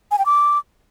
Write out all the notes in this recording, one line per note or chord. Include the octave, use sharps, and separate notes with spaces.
G#5
G5
D6